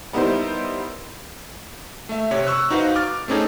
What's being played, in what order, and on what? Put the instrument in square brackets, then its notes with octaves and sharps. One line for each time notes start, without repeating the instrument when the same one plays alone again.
[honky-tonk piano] G3 B3 D#4 E4 A#4 C5
[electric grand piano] A3 E5
C3 C#5
C#6 E6 F#6
D#4 F#4 B4 C5 F5
D6 F6 A6
A3 C4 C#4 D#4 G#4 A4